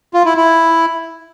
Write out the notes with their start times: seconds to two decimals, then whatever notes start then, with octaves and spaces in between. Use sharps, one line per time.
0.14 F4
0.25 E4
0.37 E4